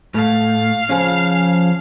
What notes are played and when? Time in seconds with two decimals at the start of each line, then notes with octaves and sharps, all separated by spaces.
0.14 A2 A3 F5
0.89 F3 C#4 G#4